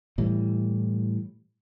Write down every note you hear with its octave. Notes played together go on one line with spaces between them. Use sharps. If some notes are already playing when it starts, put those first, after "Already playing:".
A2 E3 G3